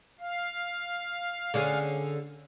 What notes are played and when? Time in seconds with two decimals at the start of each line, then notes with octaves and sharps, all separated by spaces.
0.20 F5
1.54 D3 C#4 G#4